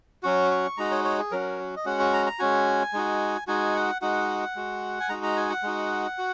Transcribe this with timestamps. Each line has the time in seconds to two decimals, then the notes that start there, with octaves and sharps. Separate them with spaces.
0.23 F#3 C#4 F#4 C#6
0.51 C#6
0.77 G#3 D#4 F#4 A#5
0.91 C#5
1.04 C#5
1.18 G#4
1.31 F#3 C#4 F#4 A#4
1.76 D#5
1.86 G#3 C#4 F#4 F#5
2.00 C#6
2.13 A#5
2.26 A#5
2.39 G#3 C#4 F#4 G#5
2.93 G#3 D#4 F#4
3.47 G#3 D#4 F#4 G#5
3.75 F#5
4.02 G#3 D#4 F#4 F#5
4.56 G#3 F#4
5.00 G#5
5.09 G#3 D#4 F#4 A#5
5.23 A#5
5.37 G#5
5.50 F#5
5.63 G#3 D#4 F#4
6.18 F#4